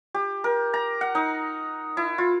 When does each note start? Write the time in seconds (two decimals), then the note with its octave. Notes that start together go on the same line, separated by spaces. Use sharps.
0.15 G4
0.44 A#4
0.74 A#5
1.01 F#5
1.15 D#4
1.97 E4
2.18 F4